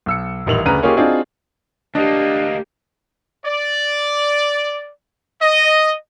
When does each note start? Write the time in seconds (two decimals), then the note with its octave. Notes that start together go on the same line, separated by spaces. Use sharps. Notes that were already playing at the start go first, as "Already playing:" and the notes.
0.06 B1 E6 C#7
0.46 D#1 A1 D#3 F7 F#7
0.65 D2 C#3 B4 A#5 D#7
0.83 A#3 C#4 D#4 F4 G4 G#4
0.97 C4 D4 D#4 F4 F#4 G#4
1.95 D2 A#3 D4 G4 D#5
3.44 D5
5.41 D#5